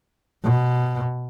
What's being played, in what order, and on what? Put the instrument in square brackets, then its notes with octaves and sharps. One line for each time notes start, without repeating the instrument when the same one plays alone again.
[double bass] B2